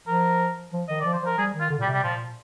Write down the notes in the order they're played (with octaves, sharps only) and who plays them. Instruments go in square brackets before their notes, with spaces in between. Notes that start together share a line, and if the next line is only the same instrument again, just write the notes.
[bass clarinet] F3 [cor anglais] A#4
[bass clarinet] F3
[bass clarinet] D#3 [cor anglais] D#5
[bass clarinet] F3 [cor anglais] D5
[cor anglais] C5
[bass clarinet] F3 [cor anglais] A#4
[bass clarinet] G3 [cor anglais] G#4
[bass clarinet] D#3
[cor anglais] F4
[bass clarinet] D3
A#2
[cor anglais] G3
[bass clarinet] C3
[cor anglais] G3
[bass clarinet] A#2 [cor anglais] F3